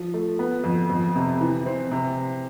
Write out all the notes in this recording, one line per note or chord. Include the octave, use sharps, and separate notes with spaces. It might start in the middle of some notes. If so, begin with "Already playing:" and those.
Already playing: F3
A3
B3
F2
F2
C3
E3
C4
C3